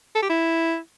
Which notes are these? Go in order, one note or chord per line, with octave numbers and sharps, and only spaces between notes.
A4
G4
E4